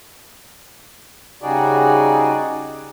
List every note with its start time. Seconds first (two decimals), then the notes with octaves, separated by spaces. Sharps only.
1.42 C#3 G3 D#4 F#4 G#4 D5